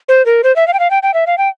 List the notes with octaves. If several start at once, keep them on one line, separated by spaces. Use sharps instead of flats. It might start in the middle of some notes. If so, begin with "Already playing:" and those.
C5
A#4
C5
E5
F5
G5
F5
G5
G5
E5
F5
G5